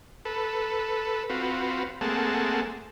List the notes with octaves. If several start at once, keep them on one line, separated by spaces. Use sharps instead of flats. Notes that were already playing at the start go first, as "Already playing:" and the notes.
A4 B4
C4 F4 F#4 B4
A3 A#3 C4 G#4 F#5 A5